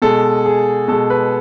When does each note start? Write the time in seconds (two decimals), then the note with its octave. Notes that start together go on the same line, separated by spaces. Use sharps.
0.02 B2 G#3 A4
0.46 G#4
0.88 B2 G#3 A4
1.10 B4